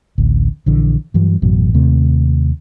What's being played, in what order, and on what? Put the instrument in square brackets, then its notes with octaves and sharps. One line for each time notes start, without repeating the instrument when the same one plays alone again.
[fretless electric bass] A1 D2
A#1 D3 E3
G2 E3 F#3
A1 F#2 B2 F#3
D#2 C3 A3